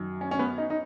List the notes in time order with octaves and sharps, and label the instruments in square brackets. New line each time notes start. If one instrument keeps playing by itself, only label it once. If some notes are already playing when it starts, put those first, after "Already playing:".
Already playing: [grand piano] F#2 D#3
C#4
C#4
B3
D#4
D#4